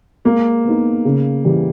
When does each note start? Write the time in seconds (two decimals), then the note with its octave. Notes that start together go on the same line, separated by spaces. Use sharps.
0.25 G#3 A#3
0.65 B3 D#4
1.05 C#3
1.45 E3 G3